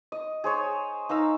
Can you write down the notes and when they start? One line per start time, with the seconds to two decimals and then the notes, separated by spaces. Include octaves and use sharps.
0.12 D#5
0.44 G#4 C5 C#5
1.09 D#4 F5 A#5 E6